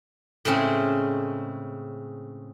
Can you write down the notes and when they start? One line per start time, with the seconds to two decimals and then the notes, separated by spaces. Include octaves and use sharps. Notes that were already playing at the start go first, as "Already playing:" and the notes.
0.45 A2 C#3 G#3 C4 C#4